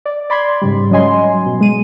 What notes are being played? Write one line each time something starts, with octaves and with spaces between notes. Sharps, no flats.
D5
D5 B5 C6 G#6
G#2 C#3 G3
F#3 C#4 D#5 G#5 C6
B2
G#3 D#7